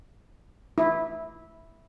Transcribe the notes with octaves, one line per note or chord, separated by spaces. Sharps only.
E4